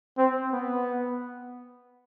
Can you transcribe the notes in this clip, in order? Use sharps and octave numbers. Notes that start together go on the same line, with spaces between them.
C4
B3